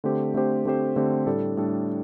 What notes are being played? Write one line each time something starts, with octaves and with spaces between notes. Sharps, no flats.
D3 A3 C4 G4 C5
D3 A3 C4 G4 C5
D3 A3 C4 G4 C5
D3 A3 C4 G4 C5
A2 G3 D4 A4
A2 G3 D4 A4